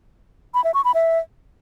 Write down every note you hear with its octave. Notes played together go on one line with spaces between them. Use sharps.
B5
E5
C#6
B5
E5